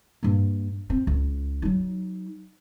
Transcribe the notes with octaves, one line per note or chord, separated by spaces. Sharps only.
G2 A#3
C4
C#2
F#3 D#4